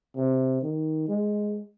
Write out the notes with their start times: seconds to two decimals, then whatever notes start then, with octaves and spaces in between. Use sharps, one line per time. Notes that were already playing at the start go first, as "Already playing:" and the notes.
0.16 C3
0.62 D#3
1.09 G#3